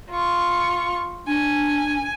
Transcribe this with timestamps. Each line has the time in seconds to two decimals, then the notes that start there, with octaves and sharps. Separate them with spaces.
0.10 F4 C#6
1.27 D4 G#5